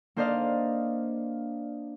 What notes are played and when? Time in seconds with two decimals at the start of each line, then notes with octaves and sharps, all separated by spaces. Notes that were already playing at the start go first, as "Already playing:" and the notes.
0.16 A#3 D4 C5 D5 D#5 F5